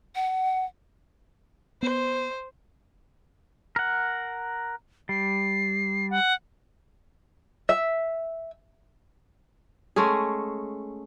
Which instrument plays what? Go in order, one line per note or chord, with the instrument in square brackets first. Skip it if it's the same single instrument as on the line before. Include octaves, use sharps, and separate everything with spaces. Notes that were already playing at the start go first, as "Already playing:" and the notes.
[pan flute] F#5
[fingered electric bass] B3 [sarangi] C5
[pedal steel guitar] A#4 F#5
[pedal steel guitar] G3 [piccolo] C7
[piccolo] F#5
[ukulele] E5
[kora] G#3 A3 C#4 G#4